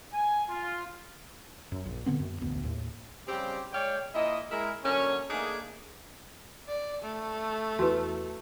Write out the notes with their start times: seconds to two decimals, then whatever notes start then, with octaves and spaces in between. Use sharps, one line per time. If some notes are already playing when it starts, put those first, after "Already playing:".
0.13 G#5
0.49 F4
1.72 F#2
1.85 A#1
2.06 A#2 D3 B3 C4
2.20 F#2
2.41 E1 A1 D2 B3
2.63 D#2 A2
3.28 C#3 G3 C4 G4
3.73 G#3 C#5 D5 F5 G5
4.14 A#2 E4 D#5
4.51 G#3 E4 A#4
4.85 D3 F#3 A#3 C#4
5.30 A3 A#3 D4 D#4 G#4
6.68 D5
7.02 A3
7.79 E2 E3 F#4 B4